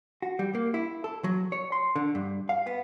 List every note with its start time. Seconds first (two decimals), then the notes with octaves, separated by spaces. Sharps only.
0.22 F#4
0.39 G3
0.55 A#3
0.74 E4
1.04 A4
1.24 F#3
1.52 C#5
1.72 C6
1.96 D3
2.15 G2
2.49 F5
2.67 B3